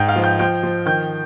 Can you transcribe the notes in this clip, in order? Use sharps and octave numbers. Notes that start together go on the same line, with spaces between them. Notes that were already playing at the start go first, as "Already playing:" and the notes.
Already playing: G#2 G5 G6
F5 F6
F3
G5 G6
F3 G5 G6
F3
D#3 G5 G6